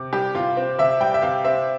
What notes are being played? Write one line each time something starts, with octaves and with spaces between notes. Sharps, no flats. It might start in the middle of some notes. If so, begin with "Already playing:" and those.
Already playing: C3
G3 G4
C3 F4
C4
C3 E5
G3 G5
E5
C3 F5
C4 E5